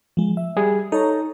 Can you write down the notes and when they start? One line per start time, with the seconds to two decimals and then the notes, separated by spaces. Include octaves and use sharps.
0.17 F3 G#3
0.37 E5
0.57 G3 G#4
0.92 D#4 A4 C#5 A#5